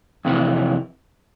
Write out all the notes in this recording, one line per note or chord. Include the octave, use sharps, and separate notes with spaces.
F2 C3 E3